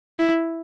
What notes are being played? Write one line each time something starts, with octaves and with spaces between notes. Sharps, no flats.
E4